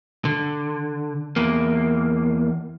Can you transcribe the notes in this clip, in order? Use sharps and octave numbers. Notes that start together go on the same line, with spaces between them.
D3
E2 A#3